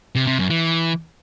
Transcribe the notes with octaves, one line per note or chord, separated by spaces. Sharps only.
C3
C3
F#2
E3